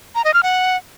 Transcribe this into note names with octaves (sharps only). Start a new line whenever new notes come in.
A#5
D#5
F6
F#5